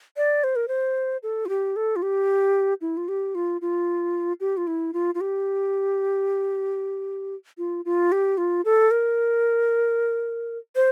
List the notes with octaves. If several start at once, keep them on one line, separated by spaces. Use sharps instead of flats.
D5
C5
A#4
C5
A4
F4
G4
A4
F4
G4
E4
F4
G4
F4
F4
G4
F4
E4
F4
F4
G4
F4
F4
G4
F4
A4
A#4
C5